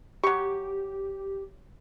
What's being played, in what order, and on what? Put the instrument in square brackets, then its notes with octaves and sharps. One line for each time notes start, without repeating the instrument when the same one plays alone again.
[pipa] F#3 C#6 [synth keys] G4